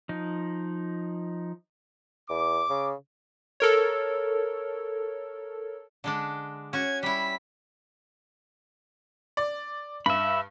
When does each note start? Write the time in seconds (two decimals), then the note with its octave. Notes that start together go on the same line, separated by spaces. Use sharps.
0.09 F3 D#4
2.29 E2 D6
2.70 C#3
3.60 A4 A#4 C#5
6.04 D3 G#3 D4
6.73 C#4 F#4 G#6
7.03 G3 E4 B6
9.37 D5
10.06 G2 E5 B5